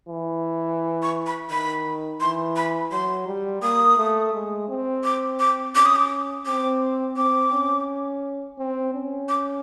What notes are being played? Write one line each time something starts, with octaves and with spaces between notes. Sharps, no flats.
E3
C#6
B5
D#3 B5
E3 C6
B5
F#3 C6
G3
A#3 D#6
A3
G#3
C4
D6
D6
C#4 D6
D#6
D6
C4 D6
C4 D6
C#4
C4
C#4
D6